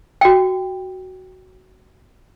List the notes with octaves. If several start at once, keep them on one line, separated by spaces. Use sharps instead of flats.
F#4 G5